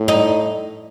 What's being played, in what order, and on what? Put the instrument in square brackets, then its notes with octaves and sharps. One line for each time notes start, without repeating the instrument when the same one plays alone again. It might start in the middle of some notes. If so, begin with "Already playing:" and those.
Already playing: [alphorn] A2
[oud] D#4